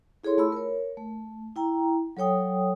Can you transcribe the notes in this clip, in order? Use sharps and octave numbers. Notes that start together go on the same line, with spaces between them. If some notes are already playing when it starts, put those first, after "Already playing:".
E4 G#4 A4 C#5 C6
A3 F4 B5 E6
A#4 C#5
A3
E4 G5 A#5
F#3 A4 C#5 G5 D#6